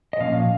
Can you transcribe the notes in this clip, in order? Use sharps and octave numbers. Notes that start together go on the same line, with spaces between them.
D#5
A#2 F3 C#4 F5